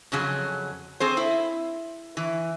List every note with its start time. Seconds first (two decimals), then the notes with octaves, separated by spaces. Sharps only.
0.12 F2 C#3 F#3 G#4
1.00 C4 G#4 C5
1.17 E4
2.17 E3